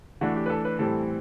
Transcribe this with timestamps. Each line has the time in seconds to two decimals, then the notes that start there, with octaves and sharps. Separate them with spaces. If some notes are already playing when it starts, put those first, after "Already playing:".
0.21 E3 A3 D4 F#4
0.36 G4
0.46 B4
0.50 A4
0.65 B4
0.79 A2 E3 G3 C4 A4